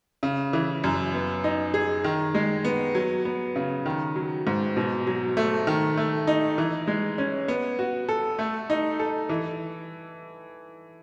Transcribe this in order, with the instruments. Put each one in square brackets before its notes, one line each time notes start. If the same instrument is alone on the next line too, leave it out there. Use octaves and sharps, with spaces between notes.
[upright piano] C#3
E3
F#2
B3
D#4
G#4
D#3
G#3
B3
F#3
B3
C#3
D#3
F#3
G#2
B2
F#3
A3
D#3
A3
D#4
E3
G#3
C#4
B3
F#4
A4
A3
D#4
A4
E3